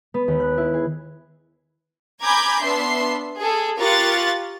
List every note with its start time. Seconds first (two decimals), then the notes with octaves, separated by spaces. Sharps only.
0.14 B3
0.28 D#2
0.40 F#6
0.58 E4
0.74 G#4
2.22 G#5 A#5 B5 D6 G6 G#6
2.63 B3 D4 E5 C6 C7
3.38 G#4 A4
3.78 F4 G4 A#4 C#6 F#6 A6